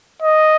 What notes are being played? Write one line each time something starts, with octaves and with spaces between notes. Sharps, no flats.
D#5